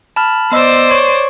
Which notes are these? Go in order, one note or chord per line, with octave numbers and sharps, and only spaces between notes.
A5 B5 F6
B3 C5 D5 D#5 E6
C#5 C#6